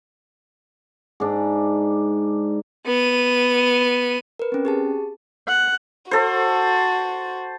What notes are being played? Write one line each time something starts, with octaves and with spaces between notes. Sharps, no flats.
G#2 D4
B3 D#7
A#4 B4
C4 C#4
G4 G#4 A5
F#5
F#4 A4 C5